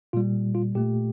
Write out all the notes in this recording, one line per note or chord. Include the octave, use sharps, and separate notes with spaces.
A#2 G3 F4
F4
A#2 A3 G4